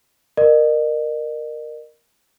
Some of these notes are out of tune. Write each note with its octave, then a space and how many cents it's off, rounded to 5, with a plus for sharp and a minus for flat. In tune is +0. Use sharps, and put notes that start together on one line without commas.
A#4 +0 D#5 -40